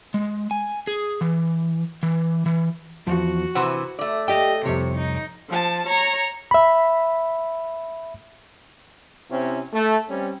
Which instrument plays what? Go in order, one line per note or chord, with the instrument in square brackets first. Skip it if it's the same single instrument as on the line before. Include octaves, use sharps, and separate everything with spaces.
[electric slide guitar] G#3
G#5
G#4
E3
E3
E3
[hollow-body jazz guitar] E2 F3 [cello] F#4
[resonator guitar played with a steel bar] C3 E3 [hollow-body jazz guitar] C5 F#5
[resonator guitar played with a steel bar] A3 D5
[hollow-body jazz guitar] G4 G5 [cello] D#5
[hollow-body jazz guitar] C2 F2 [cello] C3 [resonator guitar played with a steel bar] C#5
[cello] D#4
[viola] F3 A5
C#5 A#5
[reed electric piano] E5 B5
[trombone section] C3 C4 C#4 E4
A3
G3 C4 C#4